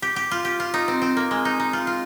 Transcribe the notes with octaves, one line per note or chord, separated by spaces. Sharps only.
G4
G4
F4
G4
F4
D#4
C4
C4
A#3
G#3
D#4
D#4
F4
F4